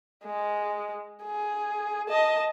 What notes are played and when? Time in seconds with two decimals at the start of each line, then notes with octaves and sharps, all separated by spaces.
0.24 G#3
1.23 G#4
2.08 D#5 A5